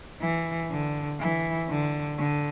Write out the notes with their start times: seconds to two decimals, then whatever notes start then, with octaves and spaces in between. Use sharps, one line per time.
0.21 E3
0.71 D3
1.20 E3
1.70 D3
2.18 D3